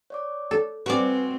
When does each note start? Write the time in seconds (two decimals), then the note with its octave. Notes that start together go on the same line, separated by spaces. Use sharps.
0.10 C#5 D5 D6
0.51 A4
0.86 C4 F#4 B4 C5 D5 G#5